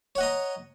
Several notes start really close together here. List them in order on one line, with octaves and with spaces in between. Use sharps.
C#5 F#5 D#5 A#5